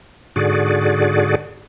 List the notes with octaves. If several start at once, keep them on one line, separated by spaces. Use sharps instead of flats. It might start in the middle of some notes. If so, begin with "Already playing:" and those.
G#2 D3 F#4 G#4 D5